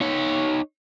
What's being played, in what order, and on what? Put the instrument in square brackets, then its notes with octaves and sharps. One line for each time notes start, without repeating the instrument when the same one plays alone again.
[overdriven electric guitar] D#4 C#5